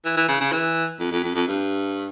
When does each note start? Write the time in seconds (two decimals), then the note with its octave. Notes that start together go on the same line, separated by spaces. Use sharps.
0.05 E3
0.17 E3
0.29 C#3
0.41 C#3
0.52 E3
0.99 F2
1.12 F2
1.23 F2
1.35 F2
1.47 G2